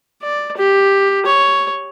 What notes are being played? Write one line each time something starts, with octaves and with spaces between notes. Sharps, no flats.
D5
G4
C#5